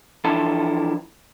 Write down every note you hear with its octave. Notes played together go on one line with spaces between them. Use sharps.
E3 F3 D4 E4 A4